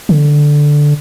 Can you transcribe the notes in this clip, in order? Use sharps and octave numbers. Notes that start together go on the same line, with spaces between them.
D3